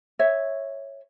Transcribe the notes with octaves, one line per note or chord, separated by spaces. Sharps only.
C#5 E5